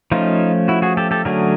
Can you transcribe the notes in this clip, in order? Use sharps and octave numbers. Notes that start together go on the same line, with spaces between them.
F3 A3 C#4 D#4 F4
E4 F#4
F#4 G#4
G4 A4
G4 A4
D3 F#3 A3 C#4 G#4 A#4